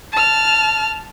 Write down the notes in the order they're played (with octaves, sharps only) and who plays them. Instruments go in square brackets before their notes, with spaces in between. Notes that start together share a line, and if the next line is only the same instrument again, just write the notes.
[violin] A5 F6